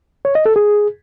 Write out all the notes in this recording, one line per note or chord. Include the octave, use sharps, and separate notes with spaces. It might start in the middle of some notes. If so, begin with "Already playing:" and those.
C#5
D#5
A4
G#4